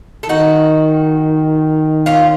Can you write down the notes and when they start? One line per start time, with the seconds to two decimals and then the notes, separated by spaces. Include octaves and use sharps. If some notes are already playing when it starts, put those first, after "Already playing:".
0.23 A4
0.29 D#3 D#4 F#4
2.06 C#4 F4